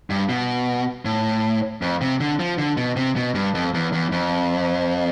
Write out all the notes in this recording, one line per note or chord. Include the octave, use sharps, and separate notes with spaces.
G2
B2
A2
F2
C3
D3
F3
D3
B2
C3
B2
G2
F2
E2
E2
F2